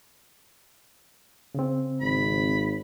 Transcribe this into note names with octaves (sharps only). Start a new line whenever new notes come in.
C#3 C4
G#1 B5